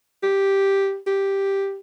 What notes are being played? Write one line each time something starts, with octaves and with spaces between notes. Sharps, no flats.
G4
G4